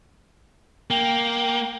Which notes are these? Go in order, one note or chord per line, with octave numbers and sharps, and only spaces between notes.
A#3 G5